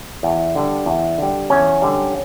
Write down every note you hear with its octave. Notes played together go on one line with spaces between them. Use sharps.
E2
D3 G3
E2
D3 G3
E2 C#4
D3 G3